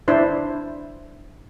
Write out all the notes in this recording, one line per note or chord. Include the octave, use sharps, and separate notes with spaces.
D4 E4 C5